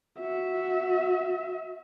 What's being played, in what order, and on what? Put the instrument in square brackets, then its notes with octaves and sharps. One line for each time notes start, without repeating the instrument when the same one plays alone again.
[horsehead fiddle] F#4 E5